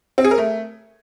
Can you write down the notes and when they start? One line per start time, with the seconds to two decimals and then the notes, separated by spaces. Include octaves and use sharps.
0.18 C4
0.24 G#4
0.31 A#4
0.38 A3